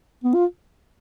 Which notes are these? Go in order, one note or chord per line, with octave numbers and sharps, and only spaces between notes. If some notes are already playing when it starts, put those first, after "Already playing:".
B3
F4